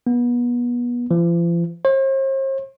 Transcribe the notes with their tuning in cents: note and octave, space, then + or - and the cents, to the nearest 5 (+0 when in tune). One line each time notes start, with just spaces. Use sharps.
B3 -30
F3 -45
C5 +45